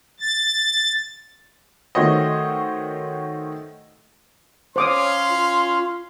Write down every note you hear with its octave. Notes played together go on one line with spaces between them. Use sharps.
A6
D#3 A3 F#4 C5 C#5 D#5
C#4 C5 C#5 F5 C6 D6 D#6
F4